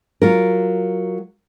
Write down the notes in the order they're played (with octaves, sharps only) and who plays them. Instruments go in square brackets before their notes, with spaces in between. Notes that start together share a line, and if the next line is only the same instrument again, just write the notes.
[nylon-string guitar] F#3 F4 A#4